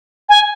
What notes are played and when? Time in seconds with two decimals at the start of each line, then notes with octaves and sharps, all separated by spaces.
0.29 G#5